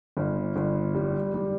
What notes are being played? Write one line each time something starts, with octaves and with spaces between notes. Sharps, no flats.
G1
G1
G3
G3